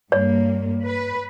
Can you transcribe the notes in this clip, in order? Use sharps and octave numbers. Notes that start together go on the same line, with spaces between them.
G2 A#3 C#5
B4